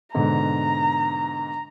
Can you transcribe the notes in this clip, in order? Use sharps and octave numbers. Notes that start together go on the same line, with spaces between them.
G#2 B2 D3 A#5